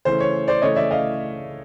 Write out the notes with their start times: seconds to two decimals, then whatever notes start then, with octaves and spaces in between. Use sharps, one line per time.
0.05 C#3 E3 A3 C#4 C5
0.20 C#5
0.48 C5 D5
0.62 C#3 E3 A3 C#4 C#5 D#5
0.76 D5 E5
0.91 D#5 F5